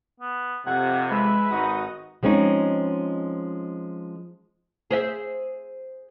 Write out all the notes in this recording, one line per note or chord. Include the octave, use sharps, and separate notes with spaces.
B3
F2 C3 F#5 G#6
G#3 B4 E5
G#1 D#4 F#4 D#6
F3 G#3 C4 C#4 D#4
G#4 C5 E5